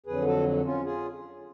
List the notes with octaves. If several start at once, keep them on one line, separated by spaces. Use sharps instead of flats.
F2 D3 F#3 G#4 B4
F#4 A4
C#4 F4
F4 G#4